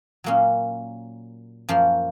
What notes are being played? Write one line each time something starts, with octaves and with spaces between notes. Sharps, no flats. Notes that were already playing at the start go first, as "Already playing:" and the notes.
A#2 F#3 A#3 C#4
F#2 F3 A#3